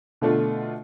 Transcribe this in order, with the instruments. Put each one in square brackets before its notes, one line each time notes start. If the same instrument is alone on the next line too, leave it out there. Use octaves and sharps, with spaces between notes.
[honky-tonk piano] B2 D3 A3 D4 F4